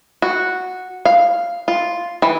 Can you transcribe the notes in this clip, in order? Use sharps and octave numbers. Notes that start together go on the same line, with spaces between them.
F#4
F5
F4
E3